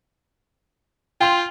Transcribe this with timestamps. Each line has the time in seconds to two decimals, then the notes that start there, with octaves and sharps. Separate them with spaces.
1.21 F4 G5 C6 F7